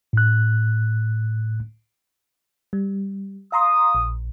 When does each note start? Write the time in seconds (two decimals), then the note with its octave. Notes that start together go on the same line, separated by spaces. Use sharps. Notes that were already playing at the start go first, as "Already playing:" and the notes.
0.13 A2 F#6
2.73 G3
3.52 F5 A#5 C6 D#6
3.95 A#1